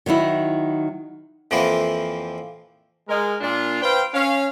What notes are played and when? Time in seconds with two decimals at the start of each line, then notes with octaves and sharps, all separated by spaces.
0.06 D#3 F#3 D#4 E4
1.51 F2 E3 F3 A#3 E4
3.08 G#3 A#4
3.41 A#2 D4 F4
3.82 B4 C5 F5 G5
4.14 C#4 F5